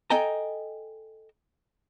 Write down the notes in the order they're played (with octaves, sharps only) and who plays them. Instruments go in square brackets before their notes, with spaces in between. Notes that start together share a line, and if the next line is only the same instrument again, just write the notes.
[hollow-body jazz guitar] A4 D#5 G5 G#5 A#5